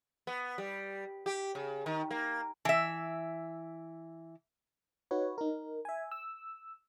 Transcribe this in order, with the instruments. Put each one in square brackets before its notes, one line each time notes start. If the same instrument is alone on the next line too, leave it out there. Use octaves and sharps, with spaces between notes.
[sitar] B3
G3
G4
C#3
D#3
A#3
[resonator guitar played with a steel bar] E3 E5
[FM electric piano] D#4 F#4 B4 C#5
D#4 A#4
E5 G#5
E6